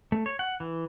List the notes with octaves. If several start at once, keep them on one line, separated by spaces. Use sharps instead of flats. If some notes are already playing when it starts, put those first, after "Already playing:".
A3
C#5
F#5
E3